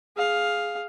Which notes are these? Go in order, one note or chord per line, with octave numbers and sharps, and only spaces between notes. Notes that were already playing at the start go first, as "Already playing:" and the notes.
G#4 F5